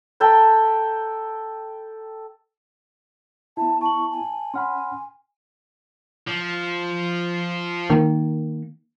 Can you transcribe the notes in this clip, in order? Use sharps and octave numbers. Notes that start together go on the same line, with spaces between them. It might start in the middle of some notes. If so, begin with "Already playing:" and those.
A4 G5 A#5 B5
B3 E4 A5
A5 C#6 F#7
G#5
C#4 F#5 B5 C6 F6
F3
D#3 A#3